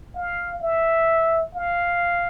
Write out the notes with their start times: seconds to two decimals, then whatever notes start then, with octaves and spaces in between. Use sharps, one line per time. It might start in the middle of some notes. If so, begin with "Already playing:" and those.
0.16 F5
0.62 E5
1.55 F5